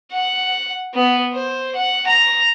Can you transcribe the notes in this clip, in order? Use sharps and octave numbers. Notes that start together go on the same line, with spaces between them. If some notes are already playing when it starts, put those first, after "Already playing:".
F#5
B3
C5
F#5
A#5